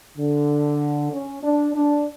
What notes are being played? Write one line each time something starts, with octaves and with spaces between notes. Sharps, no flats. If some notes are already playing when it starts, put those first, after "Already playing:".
D3
C#4
D4
D4